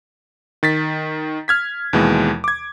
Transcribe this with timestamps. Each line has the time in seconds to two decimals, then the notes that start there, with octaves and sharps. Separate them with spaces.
0.63 D#3 A6 B6
1.48 F6 G#6 B6
1.93 D#2 B2 E3 G#3
2.44 D6 G#6